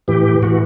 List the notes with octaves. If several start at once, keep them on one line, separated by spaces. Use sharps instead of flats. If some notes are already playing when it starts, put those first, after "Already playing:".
A2 E3 G4
A2 E3 F#4